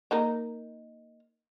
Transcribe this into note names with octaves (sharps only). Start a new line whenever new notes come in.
A#3 D#4 A#4